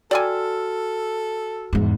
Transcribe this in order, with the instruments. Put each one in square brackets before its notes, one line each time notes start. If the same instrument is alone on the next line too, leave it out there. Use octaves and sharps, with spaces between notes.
[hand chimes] F#4 E6 F6 [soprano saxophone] A4 [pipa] D5 G5 G#5
[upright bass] E2 G#2